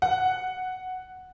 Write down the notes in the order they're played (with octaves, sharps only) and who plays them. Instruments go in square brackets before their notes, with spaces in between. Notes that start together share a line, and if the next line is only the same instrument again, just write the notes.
[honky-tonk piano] F#5